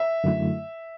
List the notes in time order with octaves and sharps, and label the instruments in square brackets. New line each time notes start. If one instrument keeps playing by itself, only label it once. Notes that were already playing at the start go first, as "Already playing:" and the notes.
Already playing: [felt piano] E5
[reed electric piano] F#2 D3 F#3 A3 E4